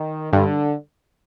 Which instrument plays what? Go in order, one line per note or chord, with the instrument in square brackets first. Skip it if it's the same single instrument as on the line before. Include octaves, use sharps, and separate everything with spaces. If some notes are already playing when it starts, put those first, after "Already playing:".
Already playing: [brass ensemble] D#3
[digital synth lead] G2 [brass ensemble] D3